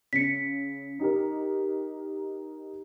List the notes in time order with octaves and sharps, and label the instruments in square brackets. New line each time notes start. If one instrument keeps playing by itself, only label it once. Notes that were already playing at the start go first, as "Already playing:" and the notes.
[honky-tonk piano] C#3 [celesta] B6 C#7
[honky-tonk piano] D#4 G4 A#4